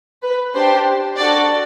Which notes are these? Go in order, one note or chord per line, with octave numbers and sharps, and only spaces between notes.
B4
D4 G4 C5
D4 F#4 A4 D5